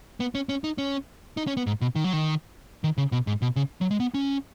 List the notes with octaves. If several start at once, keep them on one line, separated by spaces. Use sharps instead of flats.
B3
C#4
C#4
D#4
C#4
D#4
C#4
B3
G#2
B2
D#3
F#3
D#3
D#3
C#3
B2
G#2
B2
C#3
F#3
G#3
B3
C#4